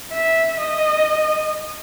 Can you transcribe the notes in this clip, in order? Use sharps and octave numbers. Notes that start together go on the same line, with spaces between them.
E5
D#5